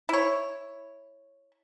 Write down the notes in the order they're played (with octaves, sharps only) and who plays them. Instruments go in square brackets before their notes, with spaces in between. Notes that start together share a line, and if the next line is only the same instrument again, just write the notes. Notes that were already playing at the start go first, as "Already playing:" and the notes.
[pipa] E4 C#5